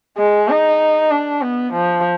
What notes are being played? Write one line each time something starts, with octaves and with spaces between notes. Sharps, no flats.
G#3
D#4
D4
B3
F3